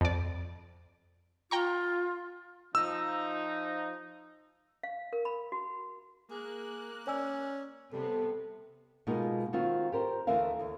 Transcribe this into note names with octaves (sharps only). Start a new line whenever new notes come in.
F2 D5
F4 G5 A#5 C#6
F3 D#4 E6
F5
A#4
B5
F#4
A#3 G#4 F#6
C#4 D5 G#5 E6
C3 G3 B3 A4
B2 G#3 A#3 B3 D#4 F4
D#3 C4 F4 F#4
G4 A#4 C5
D2 E3 A3 A#4 E5 F5
D#2